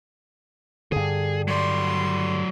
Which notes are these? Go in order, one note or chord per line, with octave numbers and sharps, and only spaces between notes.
G2 D3 G#4
F#3 D5 C6